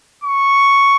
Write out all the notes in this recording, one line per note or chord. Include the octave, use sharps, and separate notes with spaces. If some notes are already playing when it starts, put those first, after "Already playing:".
C#6